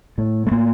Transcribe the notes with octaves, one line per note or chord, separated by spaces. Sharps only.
A2 A3
A3
A2 A#3